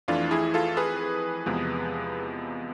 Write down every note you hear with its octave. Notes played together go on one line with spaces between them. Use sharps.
F2 E3 A3 D4 F4
E4 G#4
F4 A4
G#4 B4
E2 C3 F3 G#3 B3